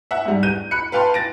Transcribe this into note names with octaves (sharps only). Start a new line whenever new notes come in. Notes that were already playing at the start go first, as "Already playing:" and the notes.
E5 F#5
G#2 G3
G6 D#7
B5 F#6 C#7
B4 F5 G5 A5 C6
A6 A#6 D7